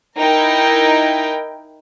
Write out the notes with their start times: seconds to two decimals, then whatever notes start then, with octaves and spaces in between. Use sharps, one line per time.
0.19 D#4 E4 A#4 G5